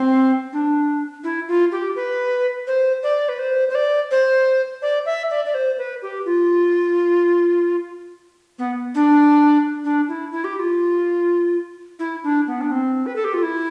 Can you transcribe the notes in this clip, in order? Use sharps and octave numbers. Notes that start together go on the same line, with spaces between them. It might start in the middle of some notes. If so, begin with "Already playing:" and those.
Already playing: C4
D4
E4
F4
G4
B4
C5
D5
B4
C5
C5
D5
C5
D5
E5
D5
D5
C5
B4
G4
F4
B3
D4
D4
E4
E4
G4
G4
F4
E4
D4
B3
D4
C4
B4
A4
G4
F4
E4